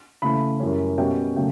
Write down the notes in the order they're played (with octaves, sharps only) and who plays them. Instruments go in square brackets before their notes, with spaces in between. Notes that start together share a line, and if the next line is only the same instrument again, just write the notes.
[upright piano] C#3 E3 A3 B5
F#2 E3 G3 C#4
B2 G3 C#4 G5
C#3 F#3 A3 G5